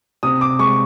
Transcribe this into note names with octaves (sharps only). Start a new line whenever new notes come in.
C3 D#6
D6
G#3 C#6